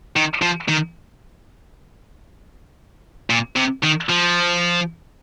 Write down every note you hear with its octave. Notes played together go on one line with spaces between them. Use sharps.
D#3
F3
D#3
A#2
C3
D#3
F3